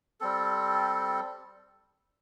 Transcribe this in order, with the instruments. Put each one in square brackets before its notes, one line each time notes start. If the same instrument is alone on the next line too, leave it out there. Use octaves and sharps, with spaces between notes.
[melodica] G3 C4 A4